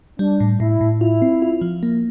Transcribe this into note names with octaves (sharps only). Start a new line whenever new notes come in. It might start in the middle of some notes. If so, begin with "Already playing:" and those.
G3 D4
A2
A2 E4
A2
E4 F4
C4
F4
F3
A#3